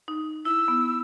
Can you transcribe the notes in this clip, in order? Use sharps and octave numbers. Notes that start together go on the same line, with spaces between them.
D#4
E4 E6
B3